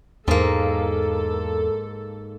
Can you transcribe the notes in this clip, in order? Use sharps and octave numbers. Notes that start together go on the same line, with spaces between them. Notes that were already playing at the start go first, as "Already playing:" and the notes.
E2 G#2 A#3 A4